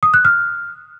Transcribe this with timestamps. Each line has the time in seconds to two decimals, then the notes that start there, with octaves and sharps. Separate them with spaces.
0.03 D#6
0.14 F#6
0.25 F6